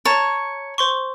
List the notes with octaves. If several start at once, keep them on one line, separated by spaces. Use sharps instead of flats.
C#5 A5 A#5 A6
C5 C6 C#6